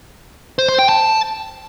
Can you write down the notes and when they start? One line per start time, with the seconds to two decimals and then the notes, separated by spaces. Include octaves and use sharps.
0.59 C5
0.69 C5
0.79 G5
0.89 A5